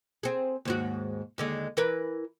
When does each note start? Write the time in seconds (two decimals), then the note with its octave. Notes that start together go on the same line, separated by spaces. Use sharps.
0.23 C4 G#4
0.65 D#2 G#2 F#4
1.38 D#2 D3 G#3
1.77 E3 A#4 B4